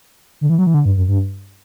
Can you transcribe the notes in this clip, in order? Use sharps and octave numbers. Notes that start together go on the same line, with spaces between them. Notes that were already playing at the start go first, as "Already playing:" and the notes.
D3
E3
F#3
E3
D3
G2
F#2
G2